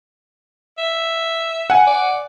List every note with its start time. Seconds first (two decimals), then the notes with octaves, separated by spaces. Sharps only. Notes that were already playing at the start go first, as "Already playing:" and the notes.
0.78 E5
1.70 F#5 G#5
1.87 D5